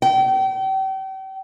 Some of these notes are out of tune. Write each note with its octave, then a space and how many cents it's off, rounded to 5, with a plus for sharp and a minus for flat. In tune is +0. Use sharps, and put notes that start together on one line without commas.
G5 -35